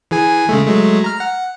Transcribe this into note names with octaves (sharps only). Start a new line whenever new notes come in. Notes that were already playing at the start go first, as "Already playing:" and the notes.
E3 G#4 G#5
C#3 G#3 A3
F#3 G#3 A3
A#5 F6
F#5